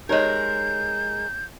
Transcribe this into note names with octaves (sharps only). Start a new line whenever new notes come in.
G#3 D#4 G4 A#4 C#5 G6